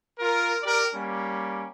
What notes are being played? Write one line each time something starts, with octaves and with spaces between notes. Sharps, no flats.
F4 A#4
G4 A#4 D5
G3 A#3 C#4